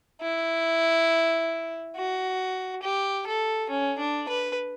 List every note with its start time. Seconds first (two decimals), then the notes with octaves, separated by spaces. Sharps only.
0.22 E4
1.96 F#4
2.82 G4
3.27 A4
3.70 C#4
3.98 D4
4.28 B4